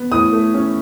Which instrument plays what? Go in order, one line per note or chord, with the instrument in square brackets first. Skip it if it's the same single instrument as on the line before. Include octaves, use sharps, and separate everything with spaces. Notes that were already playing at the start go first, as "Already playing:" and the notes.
Already playing: [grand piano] B3
A2 D#6
A3
C#4